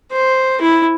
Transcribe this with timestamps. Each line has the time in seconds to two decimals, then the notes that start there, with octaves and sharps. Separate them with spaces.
0.12 C5
0.61 E4